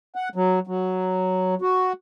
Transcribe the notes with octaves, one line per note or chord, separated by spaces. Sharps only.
F#5
F#3
F#3
F#4